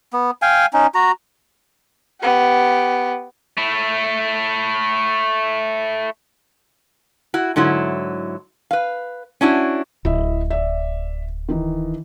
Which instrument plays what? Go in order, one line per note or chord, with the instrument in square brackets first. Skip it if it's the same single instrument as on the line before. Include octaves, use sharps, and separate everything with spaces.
[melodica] B3
F5 G5 G#5
C#4 D#4
F#4 A#5
[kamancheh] B3 G4
[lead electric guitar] A3 E4
[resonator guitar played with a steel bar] E4 F#4
G#2 D3 F#3 E4
B4 F5
C#4 D4 E4 F#4
[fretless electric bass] D1 [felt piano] E4 D#5 E5
[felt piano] D5 E5
D#3 E3 D#4